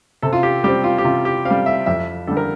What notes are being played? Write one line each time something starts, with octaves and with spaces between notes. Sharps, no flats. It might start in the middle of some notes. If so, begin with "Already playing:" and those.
C3 A4
F4
G4
G3 C4 G4
F4
G4
C3 F4
G4
C4 F5
G3
E5
F2 E5
D3 G3 A4
A#4